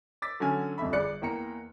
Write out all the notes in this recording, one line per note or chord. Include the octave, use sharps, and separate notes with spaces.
D6 E6 A6 B6
D3 F#3 C#4 G#5 F6
D#1 F2 D3 E5 B5
G1 G#4 D5 F#6 C#7
E2 A#3 G5 A#5 C#7